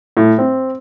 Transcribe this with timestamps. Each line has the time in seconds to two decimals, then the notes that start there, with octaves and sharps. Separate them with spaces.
0.17 A2
0.38 C4